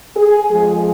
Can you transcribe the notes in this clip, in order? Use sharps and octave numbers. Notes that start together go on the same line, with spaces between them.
G#4
F2 F3 G#3 G#4